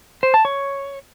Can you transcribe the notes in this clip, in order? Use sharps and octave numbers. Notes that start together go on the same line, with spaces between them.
C5
A5
C#5